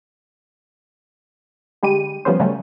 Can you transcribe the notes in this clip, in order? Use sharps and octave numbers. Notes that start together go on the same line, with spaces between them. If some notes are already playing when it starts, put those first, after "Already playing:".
D3 G3 G#3 G4 D#7
F3 G3 B3 C#4 C5
C#3 F#3 G3 A3 C#4